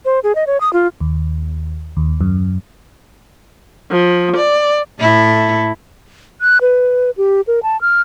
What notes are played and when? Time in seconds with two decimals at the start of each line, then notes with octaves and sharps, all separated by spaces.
0.05 C5
0.24 G#4
0.35 D#5
0.47 C#5
0.61 D#6
0.73 F4
1.01 D#2
1.97 D#2
2.21 F#2
3.91 F3
4.36 D5
5.00 A2 E4 A4
6.41 F#6
6.61 B4
7.17 G4
7.47 A#4
7.63 A5
7.81 F6